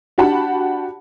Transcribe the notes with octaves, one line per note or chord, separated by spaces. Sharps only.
D4 F#4 G4 F#5 A5 B5